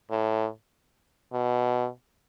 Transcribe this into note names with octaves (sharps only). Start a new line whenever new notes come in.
A2
B2